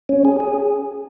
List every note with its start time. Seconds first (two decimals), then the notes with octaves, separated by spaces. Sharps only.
0.09 C#4
0.25 G#4
0.40 G#4